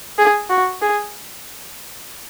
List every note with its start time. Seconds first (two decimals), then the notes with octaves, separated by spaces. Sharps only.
0.18 G#4
0.50 F#4
0.82 G#4